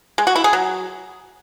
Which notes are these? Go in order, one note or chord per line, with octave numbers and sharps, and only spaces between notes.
G#3
F#4
E4
G#4
F#3